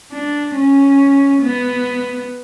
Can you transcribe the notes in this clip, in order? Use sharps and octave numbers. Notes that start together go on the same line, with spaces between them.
D4
C#4
B3